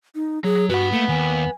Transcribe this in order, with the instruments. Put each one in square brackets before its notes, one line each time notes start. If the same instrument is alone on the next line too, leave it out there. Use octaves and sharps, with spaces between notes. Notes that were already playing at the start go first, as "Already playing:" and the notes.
[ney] D#4
[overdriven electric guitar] F#3 [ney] G#4
[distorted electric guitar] G2 [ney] F#4 [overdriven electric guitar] B4 F#5
[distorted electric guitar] A3 [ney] A#3
[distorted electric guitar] D#2 [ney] G#5